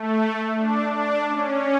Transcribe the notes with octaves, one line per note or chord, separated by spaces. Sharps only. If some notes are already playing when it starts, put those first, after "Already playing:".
Already playing: A3
D4
D4
C#4